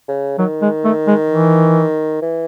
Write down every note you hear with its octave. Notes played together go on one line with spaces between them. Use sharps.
C#3
D#3 F#3
G#3
A3
G#3
E3
E3